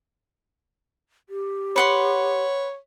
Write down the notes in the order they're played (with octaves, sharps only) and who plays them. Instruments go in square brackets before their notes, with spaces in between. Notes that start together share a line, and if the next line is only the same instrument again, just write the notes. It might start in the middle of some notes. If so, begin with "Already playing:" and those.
[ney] G4
[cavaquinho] B4 F#5 C6 [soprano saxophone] C#5